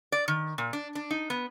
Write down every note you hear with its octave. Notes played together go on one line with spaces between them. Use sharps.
D5
D#3
A#2
D4
D4
D#4
B3